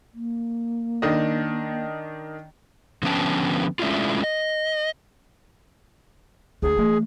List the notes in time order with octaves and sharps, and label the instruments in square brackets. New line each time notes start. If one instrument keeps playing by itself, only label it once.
[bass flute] A#3
[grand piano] D#3 D4 D#5
[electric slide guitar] D3 F3 B3 C#4 G5 A5
G#3 A3 C#4 D4 E4 F4
D#5
[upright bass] D2 A3 [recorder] G#4
[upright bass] E3 A3